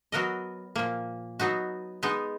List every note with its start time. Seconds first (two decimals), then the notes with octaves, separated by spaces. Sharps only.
0.12 F#3 B3 F#4 A#4 D#5
0.76 A#2 F3 A#3
1.39 F#3 B3 D#4 F#4
2.03 G#3 B3 D#4